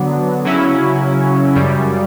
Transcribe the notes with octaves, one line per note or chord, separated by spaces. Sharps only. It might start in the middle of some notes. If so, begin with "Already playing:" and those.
Already playing: D3 F#3 B3 D4
C#3 F#3 C#4 E4
F#2 C#3 G3